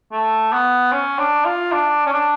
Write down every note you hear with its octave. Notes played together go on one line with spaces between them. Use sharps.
A3
B3
C#4
D4
F4
D4
C#4
D4